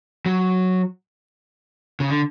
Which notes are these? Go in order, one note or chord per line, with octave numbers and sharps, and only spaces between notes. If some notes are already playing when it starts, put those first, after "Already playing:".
F#3
C#3
D3